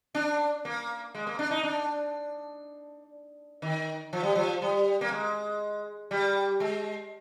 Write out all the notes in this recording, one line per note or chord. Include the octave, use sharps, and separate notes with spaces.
D4
A#3
G#3
A#3
D4
D#4
D4
D#3
F3
G3
F3
G3
A#3
G#3
G3
G#3